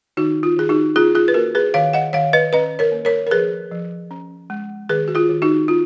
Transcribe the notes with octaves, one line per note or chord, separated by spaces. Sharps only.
D#3 D#4 F#4
F4
D#3 G#4
D#4 F#4
C#4 F4 G#4
F4 G#4
B4
A#3 F#4 A#4
G#4 B4
D#3 C#5 F5
D#5 F#5
D#3 C#5 F5
B4 D#5
C#4 B4 D#5
A#4 C#5
A#3
A#4 C#5
A#4
F3 G#4 B4
F3
C#4
G#3
D#3 G#4 B4
F#4
F4 G#4
D#3
D#4 F#4
C#4 F4